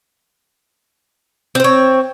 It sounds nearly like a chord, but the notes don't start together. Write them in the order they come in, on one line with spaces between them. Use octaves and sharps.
C4 C5 C#5